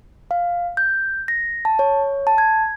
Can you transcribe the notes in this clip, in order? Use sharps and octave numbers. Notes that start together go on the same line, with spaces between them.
F5
G6
A#6
A5
C#5
A5
G#6